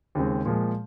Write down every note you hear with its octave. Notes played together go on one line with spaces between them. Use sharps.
D#2 C#3 G#3 C4
A#2 F3 G#3